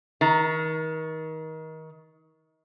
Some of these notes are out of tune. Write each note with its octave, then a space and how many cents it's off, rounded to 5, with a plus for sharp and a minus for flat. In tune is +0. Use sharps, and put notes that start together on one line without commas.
D#3 +30 A#5 +0